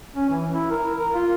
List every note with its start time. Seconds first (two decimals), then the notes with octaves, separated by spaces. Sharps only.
0.16 C#4
0.29 E3
0.54 E4
0.71 A#4
0.97 A#4
1.14 F4